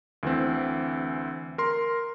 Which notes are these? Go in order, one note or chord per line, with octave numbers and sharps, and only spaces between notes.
D2 E3 C4
A#4 C6